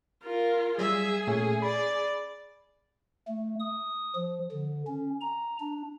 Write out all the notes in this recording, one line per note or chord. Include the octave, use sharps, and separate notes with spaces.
F4 A#4
F#3 G3 G#4 E5
A#2 A3 C#4 G#5
D5 B5
A3
D#6
F3
D3
C#4
A#5
D4